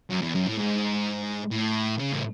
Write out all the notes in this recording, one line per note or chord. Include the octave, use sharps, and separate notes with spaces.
F#2
E2
F#2
A2
G#2
A2
C#3
A2